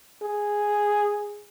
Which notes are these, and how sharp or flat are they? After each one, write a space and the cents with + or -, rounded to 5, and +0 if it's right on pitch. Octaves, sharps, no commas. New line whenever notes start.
G#4 -5